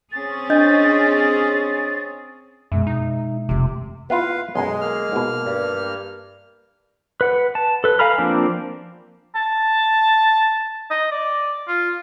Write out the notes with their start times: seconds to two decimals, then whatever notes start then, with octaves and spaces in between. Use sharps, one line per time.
0.12 C4 C#4 G#4 A6
0.50 D4 D#5 G6
2.72 F#2 B2 G#3 E5
2.87 D#4
3.49 F1 C3 F3
4.10 B3 E4 F4 B4 F5
4.55 B1 F#2 G#3 C6
4.81 A#3 F6
5.12 G#2 B2
5.46 G2
7.21 B4 F#5
7.55 A5
7.84 A4 B4
7.99 F5 G#5 A#5 B5 F6
8.18 F3 A#3 C4 D4
9.35 A5
10.90 D#5
11.11 D5
11.68 F4